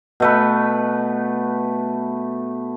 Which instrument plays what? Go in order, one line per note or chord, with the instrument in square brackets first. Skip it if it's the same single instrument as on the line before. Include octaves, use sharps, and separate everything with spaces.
[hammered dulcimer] B2 A3 B4